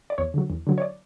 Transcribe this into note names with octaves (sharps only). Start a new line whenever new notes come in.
D5
E2 C#5
D3 F#3
E2
D3 F#3
C#5
D5